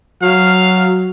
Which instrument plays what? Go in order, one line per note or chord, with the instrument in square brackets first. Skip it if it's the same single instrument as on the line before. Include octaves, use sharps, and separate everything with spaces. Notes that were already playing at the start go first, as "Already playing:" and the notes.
[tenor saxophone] F#3 [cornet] F5